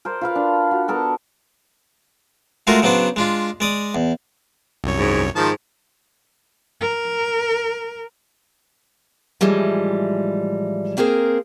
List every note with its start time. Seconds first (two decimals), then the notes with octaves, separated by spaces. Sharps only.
0.05 A#4 C5 D5
0.21 F4 B4 F5
0.35 D4
0.71 F#4
0.88 B3 A4 A#4 C#6
2.67 G#3 A3 F4 F#4 G#4 A#4
2.82 C#3 F#3 B3 D4 C5
3.16 G#3 D4 F4
3.60 G#3 D5 D#6
3.95 E2
4.84 C2 F#2 C#5
4.97 G#2
5.35 G#2 D#3 F3 A5
6.81 A#4
9.41 A2 E3 F3 G3 G#3
10.97 A#3 C4 G#4 A#4 C5